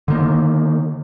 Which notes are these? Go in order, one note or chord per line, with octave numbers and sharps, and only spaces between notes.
D3 D#3 A#3